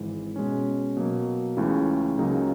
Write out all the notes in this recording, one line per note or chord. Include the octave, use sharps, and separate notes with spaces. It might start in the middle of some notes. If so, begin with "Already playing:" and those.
Already playing: G#1 G#2 E3
B2 G#3 C#4
B2 F#3 A#3
C#2 C#3 E3 A3
C#2 C#3 F#3 A#3 D#4